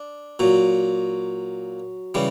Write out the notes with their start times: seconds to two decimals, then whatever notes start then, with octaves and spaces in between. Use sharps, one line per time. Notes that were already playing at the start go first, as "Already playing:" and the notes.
Already playing: D4
0.39 A#2 F#3
2.15 C#3 E3 G3